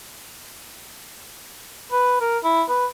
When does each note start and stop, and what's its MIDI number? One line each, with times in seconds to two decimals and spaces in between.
1.92 2.20 71
2.21 2.38 70
2.43 2.63 64
2.68 2.86 71